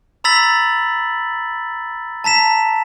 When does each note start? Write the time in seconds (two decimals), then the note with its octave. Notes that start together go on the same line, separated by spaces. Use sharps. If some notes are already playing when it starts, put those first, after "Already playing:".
0.24 A#5 B5 E6 A6 B6 F#7
2.24 A5 A#5 B6 E7